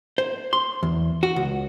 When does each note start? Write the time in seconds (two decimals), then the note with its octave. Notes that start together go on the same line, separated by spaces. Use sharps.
0.18 C5
0.53 C6
0.83 E2
1.23 F#4
1.36 C#2